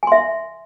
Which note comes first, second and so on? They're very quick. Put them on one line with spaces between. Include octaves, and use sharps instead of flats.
G#5 C6 E5